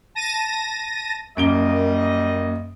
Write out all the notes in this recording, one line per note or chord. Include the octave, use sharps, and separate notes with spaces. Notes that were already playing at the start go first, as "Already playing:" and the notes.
A5 A#6 D#7
F#2 G3 A#3 D#5 D7 G7